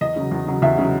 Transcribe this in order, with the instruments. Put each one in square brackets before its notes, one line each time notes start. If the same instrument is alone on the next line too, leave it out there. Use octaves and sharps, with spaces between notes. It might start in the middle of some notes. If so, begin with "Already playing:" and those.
[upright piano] E2 D#5
C#3 F#3
E2
C#3 F#3
E2 E5
C#3 F#3